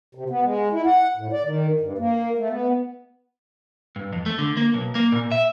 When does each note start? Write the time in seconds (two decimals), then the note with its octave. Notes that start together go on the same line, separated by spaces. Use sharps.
0.15 C3
0.30 B3
0.44 G#3
0.73 E4
0.86 F#5
1.17 A2
1.33 D5
1.45 D#3
1.81 G2
1.98 A#3
2.38 A3
2.50 B3
3.96 G2
4.13 F2
4.26 A3
4.38 D3
4.57 A#3
4.74 B1
4.95 A#3
5.12 A#2
5.32 E5